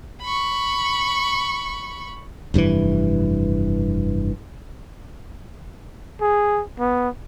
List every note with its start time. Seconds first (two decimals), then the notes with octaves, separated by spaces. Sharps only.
0.21 B5 C#6
2.54 F1 G2 B2 E3
6.21 G#4
6.79 B3